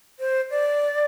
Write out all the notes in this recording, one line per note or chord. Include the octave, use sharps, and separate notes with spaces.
C5
D5